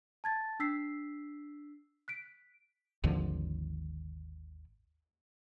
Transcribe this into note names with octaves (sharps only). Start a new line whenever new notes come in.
A5 G#6 A6
D4 E6 B6 C7
F#6 B6 D7
G#1 D#2 D3 F3